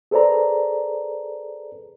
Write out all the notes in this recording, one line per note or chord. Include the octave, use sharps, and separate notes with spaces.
G#4 A4 B4 C5 D5 A#5